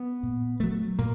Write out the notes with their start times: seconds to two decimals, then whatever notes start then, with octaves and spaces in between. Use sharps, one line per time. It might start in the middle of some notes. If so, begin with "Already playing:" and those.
Already playing: B3
0.23 A#2
0.60 F#3 A3
0.99 A#2 A#3